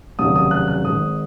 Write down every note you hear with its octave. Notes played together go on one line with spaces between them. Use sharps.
F1 D#2 C#3 F#3 D#6
D#6
F#6
F#6
G#1 G#2 D#3 D#6